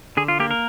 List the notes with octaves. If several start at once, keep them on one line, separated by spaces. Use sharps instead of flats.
D3 G#4
F4
A#3 G4
A#4